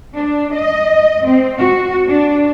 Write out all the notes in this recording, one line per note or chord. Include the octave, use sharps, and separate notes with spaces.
D4
D#5
C4
F#4
D4